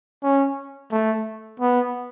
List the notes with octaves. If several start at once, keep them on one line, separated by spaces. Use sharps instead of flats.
C#4
A3
B3